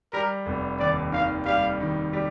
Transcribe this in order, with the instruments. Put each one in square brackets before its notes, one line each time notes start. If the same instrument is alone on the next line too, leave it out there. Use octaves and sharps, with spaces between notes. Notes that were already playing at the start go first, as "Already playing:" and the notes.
[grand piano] G3 [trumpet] A#4
[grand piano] F1
[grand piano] D#2 [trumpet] D5
[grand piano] D#3 [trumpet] F5
[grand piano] G3 [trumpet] F5
[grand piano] D#3
G3